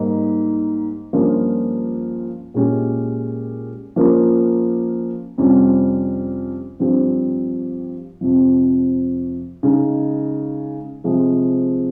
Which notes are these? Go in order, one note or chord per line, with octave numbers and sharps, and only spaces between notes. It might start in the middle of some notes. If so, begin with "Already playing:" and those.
Already playing: G#2 G3 A#3 D#4
G2 F3 A#3 C#4 F4
A#2 G#3 C#4 G4
F3 A#3 C#4 F4
F2 C3 G3 C#4 F4
G2 F3 C4 G4
F2 C3 F3
C#3 G#3 D#4
C3 F3 G#3